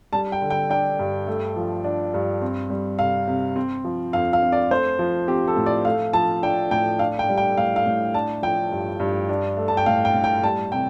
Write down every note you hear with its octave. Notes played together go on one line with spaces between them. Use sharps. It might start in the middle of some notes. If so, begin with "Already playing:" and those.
G3 A5
G5
D3
G5
D4 G5
G2
A3
F3
D4
G2
C4
G3
C3 F5
C3
C4
F3
F2 F5
F5
F2
D5
A3 C5
F3
C4 G4
A4
A2
D5
A3 F5
F3 A5
D4 G5
A2 G5
D4 F5
G5
G3
G5
A2 F5
F5
A2
D4 A5
F3 G5
G2
G2
D4
A3
A5
G5
A2 F5
G5
A2
G5
G3 A5
C3 G5